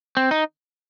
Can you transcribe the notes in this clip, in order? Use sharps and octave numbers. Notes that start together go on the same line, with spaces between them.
C4
D#4